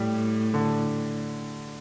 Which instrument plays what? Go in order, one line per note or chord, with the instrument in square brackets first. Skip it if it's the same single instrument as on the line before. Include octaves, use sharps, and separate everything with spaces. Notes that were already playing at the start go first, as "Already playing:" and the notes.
Already playing: [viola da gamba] A2 [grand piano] G3
[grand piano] D3